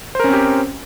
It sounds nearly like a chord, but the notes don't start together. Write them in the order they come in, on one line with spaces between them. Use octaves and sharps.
C5 A#4 C#4 C4 G4